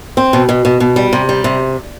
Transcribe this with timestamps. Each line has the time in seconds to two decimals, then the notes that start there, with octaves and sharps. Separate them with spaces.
0.17 C4
0.33 B2
0.49 B2
0.65 B2
0.80 B2
0.96 G3
1.13 C3
1.29 G3
1.44 C3